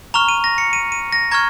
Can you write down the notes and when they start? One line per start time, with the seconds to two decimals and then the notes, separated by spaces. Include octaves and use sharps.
0.14 A#5 C#6 F6 F7
0.29 D#7
0.44 A#6
0.58 C#7
0.73 D#7
0.92 D#7
1.12 A#6
1.31 A#5 C#6 F6 G#6